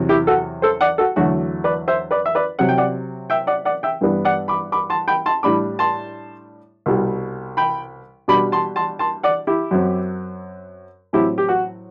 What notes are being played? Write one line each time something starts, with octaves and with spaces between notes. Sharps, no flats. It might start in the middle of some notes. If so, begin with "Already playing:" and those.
Already playing: E2 C3 F#3 C4
E4 G4
F#4 A4
A4 C5
D5 F#5
F#4 A4
E2 D3 F#3 A3 F#4
B4 D5
C5 E5
B4 D5
E5
B4 D5
C3 F#3 C4 F#5
G5
D5 F#5
E5 G5
D5 F#5
D5 F#5
E5 G5
G2 E3 G3 B3 D4
D5 F#5
B5 D6
B5 D6
A5 C6
G5 B5
A5 C6
A2 G3 D4 B5 D6
A5 C6
C2 B2 G3
G5 B5
B2 G3 D4 B5 D6
A5 C6
A5 C6
A5 C6
D5 F#5
E4 G4
F#2 F#3 C4
A2 F#3 C4 E4 G4
G4
F#4